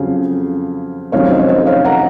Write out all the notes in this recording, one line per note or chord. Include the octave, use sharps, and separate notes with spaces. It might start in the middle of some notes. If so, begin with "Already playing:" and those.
Already playing: F2 C#3 F#3 C#4 F5
F1 F2 D#3 F#3 C#4 C#5 F5
C5 D#5
C#5
C5 D#5
C#5 F5
F#5 A#5